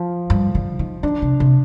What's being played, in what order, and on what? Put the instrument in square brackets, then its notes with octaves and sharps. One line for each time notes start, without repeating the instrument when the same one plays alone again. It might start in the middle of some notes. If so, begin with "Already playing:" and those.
Already playing: [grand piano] F3
[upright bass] G2
D3
D#3
[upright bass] D#3 [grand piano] D4
[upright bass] C3
C3